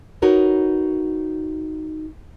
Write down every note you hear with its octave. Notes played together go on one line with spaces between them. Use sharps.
D#4 F#4 A#4 B4 C#5